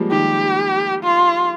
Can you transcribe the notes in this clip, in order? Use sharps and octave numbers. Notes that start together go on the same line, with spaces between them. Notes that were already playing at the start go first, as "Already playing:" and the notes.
Already playing: F3 G3 G#3 A#3
D#3 G4
F4